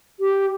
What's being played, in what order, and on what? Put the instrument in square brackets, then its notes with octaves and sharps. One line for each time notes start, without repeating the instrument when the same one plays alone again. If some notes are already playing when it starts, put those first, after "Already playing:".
[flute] G4